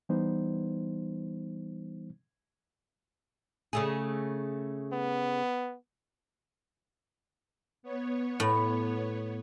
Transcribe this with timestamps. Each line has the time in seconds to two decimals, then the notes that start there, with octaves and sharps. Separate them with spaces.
0.09 E3 G3 B3 D#4 C5
3.73 C#3 A3 G#4
4.92 B3
7.83 B3 C#5
8.40 A2